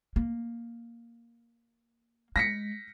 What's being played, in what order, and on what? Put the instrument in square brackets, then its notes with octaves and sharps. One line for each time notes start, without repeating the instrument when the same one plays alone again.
[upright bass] A#3
[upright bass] G#3 [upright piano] A#6 B6 C#7